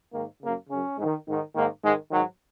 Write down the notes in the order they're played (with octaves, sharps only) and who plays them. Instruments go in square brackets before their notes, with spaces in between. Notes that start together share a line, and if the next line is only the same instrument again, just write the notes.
[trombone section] G#2 D#3 A#3
F#2 C#3 A#3
F#2 C#3 C#4
G#2
D#3
G#2 D#3
G#2 D#3 A#3
G#2 D#3 G#3
G#2 D#3 F#3